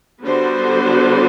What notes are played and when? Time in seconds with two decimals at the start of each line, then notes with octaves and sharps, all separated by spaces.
0.25 D3 G3 B3 F#4 C5